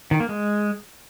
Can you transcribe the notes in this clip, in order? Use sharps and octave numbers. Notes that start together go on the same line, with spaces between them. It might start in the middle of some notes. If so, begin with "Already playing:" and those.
D#3
A#3
G#3